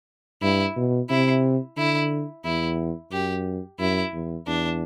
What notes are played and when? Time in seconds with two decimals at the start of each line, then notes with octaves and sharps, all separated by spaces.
0.42 G2 E4
0.76 B2
1.09 C3 E4
1.77 D3 E4
2.45 E2 E4
3.12 F#2 G4
3.79 F#2 E4
4.13 E2
4.47 E2 D4